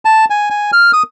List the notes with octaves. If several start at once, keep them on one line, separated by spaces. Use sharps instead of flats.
A5
G#5
G#5
F6
D#6